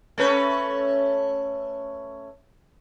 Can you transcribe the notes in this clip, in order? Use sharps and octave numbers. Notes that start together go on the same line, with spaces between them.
A3 C#4 B4